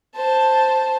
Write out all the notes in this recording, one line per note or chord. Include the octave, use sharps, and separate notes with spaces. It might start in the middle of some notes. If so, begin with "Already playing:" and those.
C5 A5